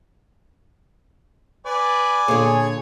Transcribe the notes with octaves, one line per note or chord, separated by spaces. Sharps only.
B4 D5 G#5 D6
A#2 D3 G#4 C#5